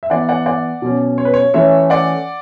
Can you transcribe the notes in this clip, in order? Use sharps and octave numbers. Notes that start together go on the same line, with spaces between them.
E5
E3 B3 D5 F#5
D5 F#5
D5 F#5
B2 F#3 C#4
C#5
B4
C#5
E3 A3 C#4 C#5 E5
D5 F#5